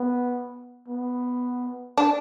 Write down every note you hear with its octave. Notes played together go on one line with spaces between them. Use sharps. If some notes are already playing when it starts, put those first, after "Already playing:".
Already playing: B3
B3
D4